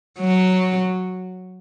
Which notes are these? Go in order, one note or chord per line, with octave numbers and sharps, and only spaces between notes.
F#3